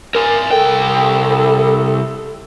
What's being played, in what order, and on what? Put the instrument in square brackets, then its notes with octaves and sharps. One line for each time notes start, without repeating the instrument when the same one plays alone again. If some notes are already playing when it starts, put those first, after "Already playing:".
[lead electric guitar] A#4 G#5
[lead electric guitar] C2 G5 [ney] A4